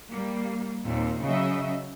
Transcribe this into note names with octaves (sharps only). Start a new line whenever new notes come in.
G3 A#3
D#2 A#2 C4
C#3 F#3 D#5 E5